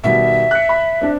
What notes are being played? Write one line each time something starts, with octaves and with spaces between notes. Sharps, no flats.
B2 D#3 G3 E5
F#6 C#7
B5
C4 D4